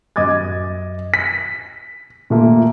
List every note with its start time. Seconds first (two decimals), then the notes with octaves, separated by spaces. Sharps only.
0.16 F#2 D#5 D6 G#6 A6
1.14 B6
2.30 A#2 A3 A#3